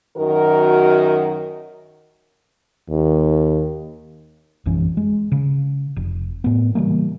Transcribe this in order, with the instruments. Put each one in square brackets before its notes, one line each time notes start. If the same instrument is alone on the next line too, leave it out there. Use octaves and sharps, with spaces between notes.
[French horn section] F#2 D#3 F#4 A#4
[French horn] D#2
[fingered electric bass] A#1 F#2 E3 C#4
G#3
C#3
F1
A2 B3
C#3 E3 G3 A#3